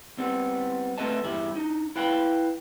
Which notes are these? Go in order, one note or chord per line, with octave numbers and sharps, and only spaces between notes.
G3 B3 C4
A3 C4 A4 B4 D#5 A5
E2 G2 E4 G4
D4 D#4
E4 B4 F5 G5 A5 B5